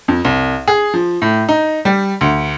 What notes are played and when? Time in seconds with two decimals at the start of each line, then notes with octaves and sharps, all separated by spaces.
0.08 F2
0.25 C2
0.68 G#4
0.94 F3
1.22 A2
1.49 D#4
1.85 G3
2.21 D2